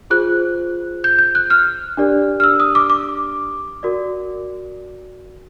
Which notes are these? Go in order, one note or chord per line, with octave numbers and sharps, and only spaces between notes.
F4 G#4 C5 F#6
G6
G6
F#6
F6
D4 G4 A#4 D5
F6
E6
D#6
D6
D6
F#4 A#4 D5